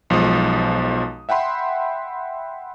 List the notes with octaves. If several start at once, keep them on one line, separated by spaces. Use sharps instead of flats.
B1 F3 G#3 D#6
E5 F#5 G5 B5 C6